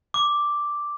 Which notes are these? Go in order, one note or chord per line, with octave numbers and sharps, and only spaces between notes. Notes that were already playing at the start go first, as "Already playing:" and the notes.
D6